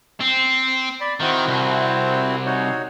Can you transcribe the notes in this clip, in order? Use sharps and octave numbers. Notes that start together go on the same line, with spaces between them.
C4
D5 B5
D#3 C4 E4 F#4
C2
D#4 F#4 C#5